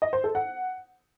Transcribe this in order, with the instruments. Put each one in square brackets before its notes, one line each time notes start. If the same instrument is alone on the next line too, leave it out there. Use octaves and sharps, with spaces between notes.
[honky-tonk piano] D#5
C5
A4
F#5